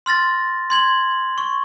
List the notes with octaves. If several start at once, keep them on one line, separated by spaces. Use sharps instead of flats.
C6 F6 A6 A#6
C6 G#6 F#7
C#6